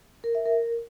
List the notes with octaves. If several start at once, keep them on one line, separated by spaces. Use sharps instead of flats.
A#4
E5
A#4